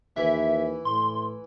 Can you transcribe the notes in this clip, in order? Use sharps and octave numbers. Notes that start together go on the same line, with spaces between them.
D#2 E3 E5
A2 C6